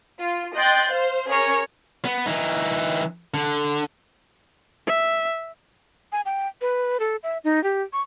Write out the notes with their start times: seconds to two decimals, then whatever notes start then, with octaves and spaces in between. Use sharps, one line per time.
0.20 F4
0.56 D#5 G5 C6 F#6 G6 A6
0.90 C5 F5
1.29 C#4 G#4 A#4 C#5
2.05 B3
2.26 E3 D#4
3.34 D3
4.87 E5
6.12 G#5
6.26 G5
6.61 B4
7.00 A4
7.23 E5
7.44 D#4
7.64 G4
7.93 C#6